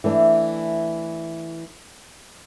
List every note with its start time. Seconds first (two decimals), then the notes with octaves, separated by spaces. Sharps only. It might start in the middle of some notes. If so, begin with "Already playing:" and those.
0.04 E3 A3 D4